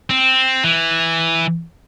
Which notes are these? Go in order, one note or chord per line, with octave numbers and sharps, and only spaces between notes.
C4
E3